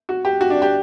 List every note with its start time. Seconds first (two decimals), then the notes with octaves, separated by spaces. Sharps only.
0.09 F#4
0.25 G4
0.41 F#4
0.50 D4
0.62 G4